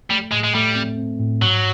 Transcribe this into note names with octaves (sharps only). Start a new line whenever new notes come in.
G3 A3
A2 G#3
G#3
G3 A3
C4
C4
A2
G#2 F#3